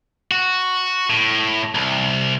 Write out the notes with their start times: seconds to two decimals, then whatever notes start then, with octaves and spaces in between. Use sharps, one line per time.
0.31 F#4
1.10 A2
1.75 C2